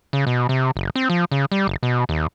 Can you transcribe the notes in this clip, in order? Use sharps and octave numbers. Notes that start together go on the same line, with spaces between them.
C#3
B2
C3
F#1
C4
F3
C#3
G3
F#1
B2
D#2